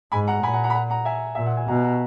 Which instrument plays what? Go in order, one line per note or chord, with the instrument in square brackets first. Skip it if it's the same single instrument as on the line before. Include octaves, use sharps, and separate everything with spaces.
[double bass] G#2 [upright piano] G#5 B5
[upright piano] F#5 A#5
[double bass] A#2 [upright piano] G#5 B5
[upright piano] F#5 A#5
F#5 A#5
B5
F#5 A#5
F#5 A#5
E5 G#5
[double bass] A#2 [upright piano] E5
[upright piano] F#5
G#5
[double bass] B2 [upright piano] F#5 A#5
[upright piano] F#5 A#5